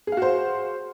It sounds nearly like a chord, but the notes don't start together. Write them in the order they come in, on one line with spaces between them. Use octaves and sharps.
G#4 F5 F#4 C5